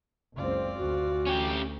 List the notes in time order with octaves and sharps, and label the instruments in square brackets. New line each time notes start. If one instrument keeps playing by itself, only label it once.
[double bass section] F#1 C#2 C4 [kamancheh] F4 D5
[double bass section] D2 [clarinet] F#4
[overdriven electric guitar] C#4 G4